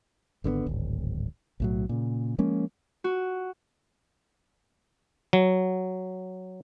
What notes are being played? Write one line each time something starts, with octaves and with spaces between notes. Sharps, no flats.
G#1 D3 F3 B3
D1 G#1
B1 A2 F#3
A#2 C#3
F3 G#3 A#3 C#4
F#4
F#3